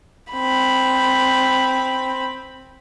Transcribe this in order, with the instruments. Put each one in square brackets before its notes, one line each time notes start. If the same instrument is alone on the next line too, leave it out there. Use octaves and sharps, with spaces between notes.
[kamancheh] C4 B5